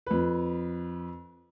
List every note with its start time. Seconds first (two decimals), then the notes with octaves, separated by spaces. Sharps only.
0.07 F2 B4